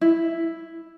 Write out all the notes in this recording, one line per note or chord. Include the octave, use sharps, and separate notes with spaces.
E4